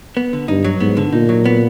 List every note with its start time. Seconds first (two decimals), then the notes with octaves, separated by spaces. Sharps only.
0.17 B3
0.33 D3
0.48 G2 D#4
0.64 F#3
0.80 G#2 B3
0.97 D3
1.13 A#2 D#4
1.29 F#3
1.46 B3